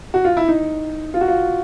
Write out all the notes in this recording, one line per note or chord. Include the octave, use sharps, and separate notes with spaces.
F#4
F4
E4
D#4
F4
F#4
F4